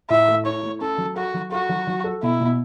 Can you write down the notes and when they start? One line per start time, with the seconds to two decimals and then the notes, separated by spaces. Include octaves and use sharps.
0.10 A2 E5
0.28 A3
0.45 E4 C#5
0.63 A3
0.81 C#4 A4
0.98 F#3
1.16 F#4 A4
1.34 F#3
1.52 F#4 A4
1.69 F#3
1.87 F#3
2.04 A4
2.23 B2 E4
2.41 B2